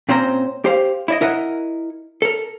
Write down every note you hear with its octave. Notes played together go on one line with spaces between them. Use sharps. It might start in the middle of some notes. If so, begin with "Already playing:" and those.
A#2 C4 C#4 C5 A#5
G4 C5 F5
E4 D5 D#5
E4 A#4 D#5 F#5
A4 A#4